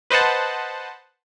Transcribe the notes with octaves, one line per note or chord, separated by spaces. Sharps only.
B4 C5 D#5 F#5 A5